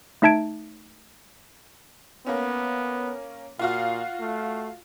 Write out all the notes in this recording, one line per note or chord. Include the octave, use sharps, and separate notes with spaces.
A3 D#4 E5 A5 G#6 D7
A#3 B3 C#4
A#2 F4 F#4 F5
A3